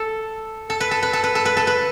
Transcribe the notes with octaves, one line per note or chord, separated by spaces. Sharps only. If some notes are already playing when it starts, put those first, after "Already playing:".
Already playing: A4
A4
B4
A4
B4
A4
B4
A4
B4
A4
B4